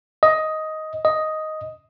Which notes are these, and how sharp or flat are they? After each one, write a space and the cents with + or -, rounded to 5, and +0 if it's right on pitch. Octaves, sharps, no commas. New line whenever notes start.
D#5 +10
D#5 +5